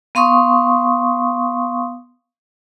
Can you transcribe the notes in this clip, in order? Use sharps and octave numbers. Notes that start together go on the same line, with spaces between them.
B3 F5 C6 C#6 D#6